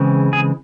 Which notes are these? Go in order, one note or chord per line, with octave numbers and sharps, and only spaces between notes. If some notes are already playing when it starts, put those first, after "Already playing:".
Already playing: C#3 E3 G#3 C4
G#4